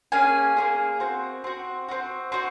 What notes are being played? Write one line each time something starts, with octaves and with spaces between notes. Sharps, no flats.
A#3 C#4 G#4 G#5
A#3 C#4 G#4
C4 F#4
C4 F#4
C4 F#4
C4 F#4